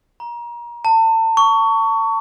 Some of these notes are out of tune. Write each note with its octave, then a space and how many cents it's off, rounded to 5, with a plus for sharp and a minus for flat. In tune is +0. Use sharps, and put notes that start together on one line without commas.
A#5 +30
A5 +35
C#6 +20